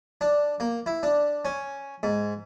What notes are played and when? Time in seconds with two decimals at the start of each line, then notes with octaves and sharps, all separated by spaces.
0.21 D4
0.60 A#3
0.86 E4
1.03 D4
1.45 C#4
2.03 G#2